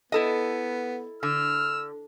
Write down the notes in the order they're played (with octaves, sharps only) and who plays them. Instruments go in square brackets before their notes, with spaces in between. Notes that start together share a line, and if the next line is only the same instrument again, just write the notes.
[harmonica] B3 [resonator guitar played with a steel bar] E4 A4 D#5
[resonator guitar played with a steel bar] D3 [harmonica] E6 F6